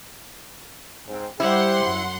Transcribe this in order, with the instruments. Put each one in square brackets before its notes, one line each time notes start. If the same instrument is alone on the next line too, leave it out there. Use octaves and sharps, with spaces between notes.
[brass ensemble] G#2 C4
[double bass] G3 [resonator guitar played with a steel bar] E4 [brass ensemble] G4 C5 [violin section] F#5 C6
[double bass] F#2